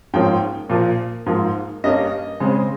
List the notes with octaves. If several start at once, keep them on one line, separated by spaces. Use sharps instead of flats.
G#2 F3 A#3 C#4 G5
A#2 F3 A#3
G#2 F3 A#3
G2 G3 A#3 C#4 D#5
C#3 G#3 C4